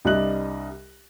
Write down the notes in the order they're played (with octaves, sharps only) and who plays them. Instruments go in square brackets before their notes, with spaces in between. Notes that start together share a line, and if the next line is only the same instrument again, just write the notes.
[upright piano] C2 G3 D4 D#5 F#6 F#7